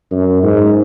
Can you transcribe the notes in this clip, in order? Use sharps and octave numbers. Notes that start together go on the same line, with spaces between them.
F#2
G#2